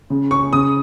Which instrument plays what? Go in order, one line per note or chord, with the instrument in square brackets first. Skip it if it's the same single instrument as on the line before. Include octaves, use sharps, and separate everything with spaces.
[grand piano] C#3
C#4 C#6
C#3 D#6